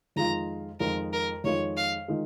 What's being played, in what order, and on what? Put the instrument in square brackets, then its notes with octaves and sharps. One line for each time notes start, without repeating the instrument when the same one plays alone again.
[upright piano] F2 D#3 G#3 F4 [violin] A#5
[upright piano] F2 D#3 G#3 F4 [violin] A#4
[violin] A#4
[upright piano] F2 D#3 G#3 F4 [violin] C#5
[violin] F5
[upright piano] D#3 G#3 F4